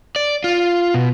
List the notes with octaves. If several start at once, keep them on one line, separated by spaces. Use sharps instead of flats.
D5
F4
B2